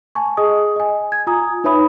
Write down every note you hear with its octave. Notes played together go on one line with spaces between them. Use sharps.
G#5 A5 C#6
G#4 D#5 D#6
D#5 G#5
G#6
F4 G#5 A#5 D#6
D#4 B4 C#5 E5 B5 D#6